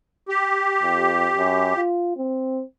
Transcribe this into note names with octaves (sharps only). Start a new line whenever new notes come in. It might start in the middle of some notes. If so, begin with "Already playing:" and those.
G4
F2
F#2
F4
C4